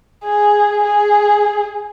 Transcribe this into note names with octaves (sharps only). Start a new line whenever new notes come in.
G#4
G#4